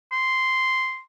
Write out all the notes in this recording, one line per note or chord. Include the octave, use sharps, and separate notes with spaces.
C6